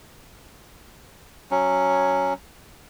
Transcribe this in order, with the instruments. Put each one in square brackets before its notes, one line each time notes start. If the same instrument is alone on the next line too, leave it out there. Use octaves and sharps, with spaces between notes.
[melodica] F#3 C#4